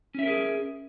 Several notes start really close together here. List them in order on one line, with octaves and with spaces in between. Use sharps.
C#4 E5 A#4 G#4